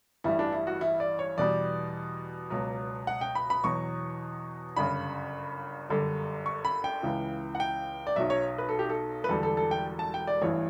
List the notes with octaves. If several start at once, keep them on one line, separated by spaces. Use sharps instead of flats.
A1 G2 E3 G3 E4
D4
E4
F#4
E4
D5
C#5
E2 B2 G3 D5
C#2 B2 F#3
F#5
G5
B5
B5
E2 B2 F#3 C#6
G1 F#2 C#3 B5
G1 F#2 D3 G3
C#6
B5
G5
C#2 C#3 E3
F#5
G5
D5
B1 B2 F#3 E5
C#5
B4
A4
G4
A4
B4
E1 E2 D3 G3 A4
A4
A4
G5
A5
G5
D5
A1 G2 E3 C#5